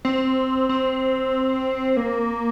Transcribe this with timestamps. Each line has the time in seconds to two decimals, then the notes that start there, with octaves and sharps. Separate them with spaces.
0.05 C4
0.69 C4
1.97 A#3